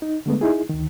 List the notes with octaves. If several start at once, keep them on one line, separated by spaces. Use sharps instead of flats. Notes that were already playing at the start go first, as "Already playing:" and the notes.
D#4
D3 G#3 A3 B3
D#4 E4 G#4
D2 D#3